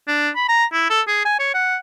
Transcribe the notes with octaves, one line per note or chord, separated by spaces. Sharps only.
D4
B5
A#5
E4
A4
G#4
G#5
C#5
F#5